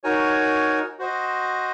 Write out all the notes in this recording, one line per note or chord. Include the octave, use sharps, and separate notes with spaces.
D#4 F#4 A#4 C#5 G#5
F#4 C5 D#5